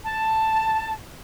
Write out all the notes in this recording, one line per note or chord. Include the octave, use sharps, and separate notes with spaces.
A5